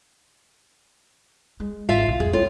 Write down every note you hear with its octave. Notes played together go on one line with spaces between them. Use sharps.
G#3
G#1 F4 E5 F5
B1
F2 G#4
A2 F3 C#4 F4